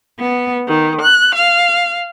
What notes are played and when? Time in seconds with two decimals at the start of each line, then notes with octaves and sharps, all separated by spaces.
0.18 B3
0.68 D#3
1.01 F#6
1.36 F5